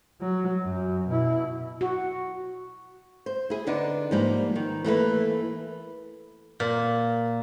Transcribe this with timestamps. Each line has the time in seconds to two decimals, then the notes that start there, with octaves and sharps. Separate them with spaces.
0.21 F#3
0.63 F#2
1.08 B2 E4
1.81 F#4
3.26 C5
3.50 E4 G#4
3.67 D3 B3 D4 D#4
4.11 G#2 F3 G3 A#3
4.56 D#3
4.84 E3 A3 A#3 B4
6.60 A#2